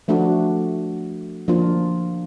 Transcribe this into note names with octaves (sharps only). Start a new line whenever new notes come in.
F3 A3 D4 F#4
F3 A#3 D4 F4